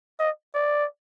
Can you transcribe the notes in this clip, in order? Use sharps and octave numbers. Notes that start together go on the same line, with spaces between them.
D#5
D5